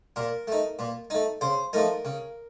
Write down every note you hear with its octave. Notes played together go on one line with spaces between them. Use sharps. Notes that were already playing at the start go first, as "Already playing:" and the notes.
A#2 A#4
A3 D#4
A#2
A3 D#4
C#3 C5
F3 A3 D#4 A#4
C#3